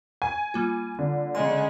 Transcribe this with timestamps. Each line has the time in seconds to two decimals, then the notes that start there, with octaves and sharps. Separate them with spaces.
0.22 G#5
0.54 G3 A#3 F4
0.99 D3
1.35 C#3 G#3 C6